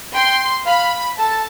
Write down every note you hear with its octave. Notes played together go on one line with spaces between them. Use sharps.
G5 C6
F5 B5
A4 A5